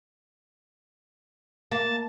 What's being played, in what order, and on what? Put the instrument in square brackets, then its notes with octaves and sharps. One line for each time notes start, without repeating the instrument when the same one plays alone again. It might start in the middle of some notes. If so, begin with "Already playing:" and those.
[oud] A#3 [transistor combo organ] A5